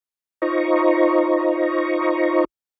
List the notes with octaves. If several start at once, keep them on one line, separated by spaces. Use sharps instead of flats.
D#4 F4 C5 D#5 A#5 C#6